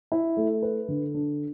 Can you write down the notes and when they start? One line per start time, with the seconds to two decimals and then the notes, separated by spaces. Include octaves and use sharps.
0.12 E4
0.37 A3
0.62 B4
0.88 D3
1.15 D4